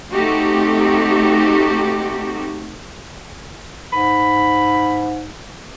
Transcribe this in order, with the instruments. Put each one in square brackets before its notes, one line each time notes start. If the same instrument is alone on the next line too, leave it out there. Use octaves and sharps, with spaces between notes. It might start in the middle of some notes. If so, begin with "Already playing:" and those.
[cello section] A3 C4 D#4 F#4 G4 A4
[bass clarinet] G#2 [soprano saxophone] B5